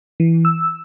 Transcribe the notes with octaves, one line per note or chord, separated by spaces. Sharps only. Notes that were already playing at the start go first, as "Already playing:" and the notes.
E3
E6